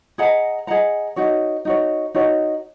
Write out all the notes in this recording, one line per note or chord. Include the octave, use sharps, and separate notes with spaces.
G#4 D#5 F#5 A#5
G#4 D#5 F#5 A#5
D#4 F#4 C#5
D#4 F#4 C#5
D#4 F#4 C#5